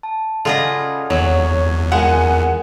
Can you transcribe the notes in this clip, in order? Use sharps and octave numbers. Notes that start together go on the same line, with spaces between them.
A5
C#3 F4 G#4 A4 D5 D#5 F#5
E2 F#3 C#5
G#3 F4 A#4 F#5 G#5